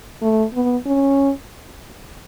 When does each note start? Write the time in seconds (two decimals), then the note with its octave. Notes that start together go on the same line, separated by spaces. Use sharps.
0.22 A3
0.54 B3
0.86 C#4